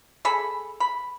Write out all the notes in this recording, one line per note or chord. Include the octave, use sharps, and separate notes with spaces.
G#4 A4 B5
B5